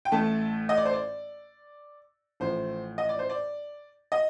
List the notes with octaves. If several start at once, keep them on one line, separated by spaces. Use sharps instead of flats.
G5
A1 A2 A3 A5
D#5
D5
C5
D5
A1 A2 F3 C5
D#5
D5
C5
D5
D#5